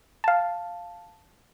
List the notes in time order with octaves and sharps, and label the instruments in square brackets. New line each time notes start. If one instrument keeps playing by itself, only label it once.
[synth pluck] F5 A5